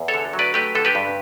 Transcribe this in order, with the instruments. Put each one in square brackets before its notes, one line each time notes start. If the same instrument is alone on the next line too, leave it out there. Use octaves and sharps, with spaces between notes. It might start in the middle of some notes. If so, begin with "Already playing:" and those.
Already playing: [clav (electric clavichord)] E2
A4 C#5
D3
F#3
B4 D5
A3 G4 B4
D3 A4
G4 B4
G2